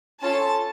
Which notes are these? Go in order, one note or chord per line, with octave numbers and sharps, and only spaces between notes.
C#4 F4 A4 A5